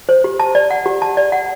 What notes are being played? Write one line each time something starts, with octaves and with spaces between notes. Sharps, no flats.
C5
G4
A5
D5
F#5
G4
A5
D5
F#5